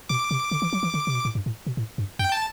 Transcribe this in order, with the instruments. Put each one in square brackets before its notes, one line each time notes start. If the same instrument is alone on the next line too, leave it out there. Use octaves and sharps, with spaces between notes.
[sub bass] B2 [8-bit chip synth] D6
[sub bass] C3
D3
E3
F#3
E3
D3
C3
B2
A2
G2
A2
B2
A2
G2
[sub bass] F#2 [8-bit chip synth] G5
[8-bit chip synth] A5